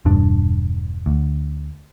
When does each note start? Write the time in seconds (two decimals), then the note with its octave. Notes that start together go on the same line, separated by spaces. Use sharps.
0.05 E1 G2 D4
1.06 D2